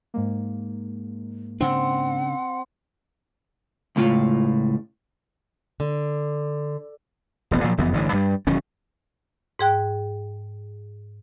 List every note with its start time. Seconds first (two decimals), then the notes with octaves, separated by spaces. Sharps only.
0.14 G#2 G#3 A#3
1.61 C#3 C4 D4 F#5
3.96 C#2 A2 F4
5.80 D3
7.51 D#1 A1 B3
7.64 A#2 F3 F#3
7.78 F#1 F2 E3 B3
7.93 A1 G2 D3 E3
8.13 G2 G3
8.47 E1 D#3 F#3 C#4
9.59 G#2 G#4 G5 F#6